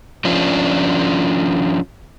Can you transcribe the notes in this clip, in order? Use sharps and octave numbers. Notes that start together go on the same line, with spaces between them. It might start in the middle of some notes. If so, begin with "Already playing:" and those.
F3 C#4 D4 F4